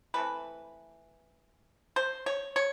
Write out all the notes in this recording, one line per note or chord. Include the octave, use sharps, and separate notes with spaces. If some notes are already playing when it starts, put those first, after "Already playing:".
E3 A3 C4 B4
C5
C#5
C#5